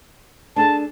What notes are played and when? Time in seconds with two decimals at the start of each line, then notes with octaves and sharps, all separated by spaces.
0.56 D4 G#4 A4 A5